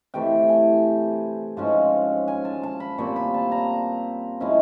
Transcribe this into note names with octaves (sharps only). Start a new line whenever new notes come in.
C3 E3 A3 G5
G#5
G#2 F3 G#3 C#4
G#5
A5
A5
B5
A#2 G3 C4 C#6
B5
A5
A#5
F3 G#3 C#4 E4